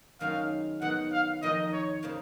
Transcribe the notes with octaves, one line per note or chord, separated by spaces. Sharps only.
F#2 D#3 G#3 C#4 F#4 F5
D#3 F#3 B3 F#5
F5
F2 D#3 A#3 D#4 D#5
C#5
C#3 F3 A#3 F4